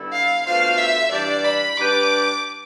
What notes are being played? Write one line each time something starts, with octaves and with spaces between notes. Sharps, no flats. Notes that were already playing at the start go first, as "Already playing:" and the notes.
Already playing: D3 G3 B3 E4 A4
F5
B2 A3 D4 F4 C5 F5
E5
G2 E3 G3 D4 D5
B5
G3 D4 G4 B4 D6